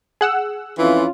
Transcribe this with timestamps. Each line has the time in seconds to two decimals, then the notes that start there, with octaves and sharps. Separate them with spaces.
0.21 G#4 F#5 E6
0.79 F2 E3 C#4 F4